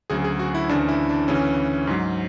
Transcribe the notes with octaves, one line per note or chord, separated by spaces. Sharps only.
D2 C#3 F#3 G#4
G#4
F#4
E4
D2 C#3 E3 D4
E4
D4
D2 C#3 E3 C#4
G#2 F#3